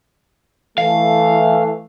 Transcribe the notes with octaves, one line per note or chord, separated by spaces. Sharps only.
E3 A3 F5